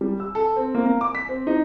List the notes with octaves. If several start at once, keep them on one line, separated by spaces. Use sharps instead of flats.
G3
E6
A4
C4
A#3
A#3
D6
B6
C4
D#4